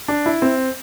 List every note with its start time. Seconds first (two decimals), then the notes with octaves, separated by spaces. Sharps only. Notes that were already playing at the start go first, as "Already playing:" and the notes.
0.08 D4
0.26 E4
0.42 C4